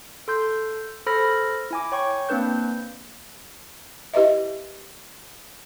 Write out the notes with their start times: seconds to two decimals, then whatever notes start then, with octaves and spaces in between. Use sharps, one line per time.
0.28 A4 C6 G6
1.06 A4 C5 B5 F6 A#6
1.70 E4 G#5 D6
1.92 C#5 G5 C#6
2.29 A#3 C4 D4 B4 G6
4.14 E4 G4 B4 D#5 E5